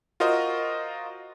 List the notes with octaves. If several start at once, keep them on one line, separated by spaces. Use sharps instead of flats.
F4 F#4 A#4 C5 D#5